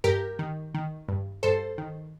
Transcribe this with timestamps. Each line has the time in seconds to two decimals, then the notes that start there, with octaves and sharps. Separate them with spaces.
0.04 G2 G4 A#4
0.39 D#3
0.74 D#3
1.08 G2
1.43 G2 A4 C5
1.78 D#3